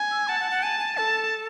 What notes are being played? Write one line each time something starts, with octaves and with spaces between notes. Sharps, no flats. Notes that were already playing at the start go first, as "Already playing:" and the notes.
Already playing: G#5
E6
F#5 A5
F#5
F#5
G#5 A5
G#5
A4 A5